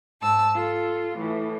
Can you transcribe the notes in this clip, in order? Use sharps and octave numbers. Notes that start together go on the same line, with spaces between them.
G#2 A5 E6
F4 A4
A2 E3